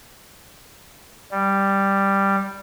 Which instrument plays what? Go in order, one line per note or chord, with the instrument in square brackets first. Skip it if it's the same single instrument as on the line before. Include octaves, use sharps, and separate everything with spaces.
[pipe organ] G3